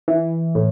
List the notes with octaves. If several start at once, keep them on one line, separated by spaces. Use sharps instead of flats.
E3
A2